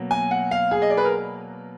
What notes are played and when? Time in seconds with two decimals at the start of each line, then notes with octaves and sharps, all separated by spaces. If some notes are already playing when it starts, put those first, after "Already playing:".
Already playing: B2 F#3 A#3
0.11 G#5
0.31 F#5
0.51 F5
0.71 G#4
0.82 D#5
0.90 D5
0.97 B4
1.05 A#4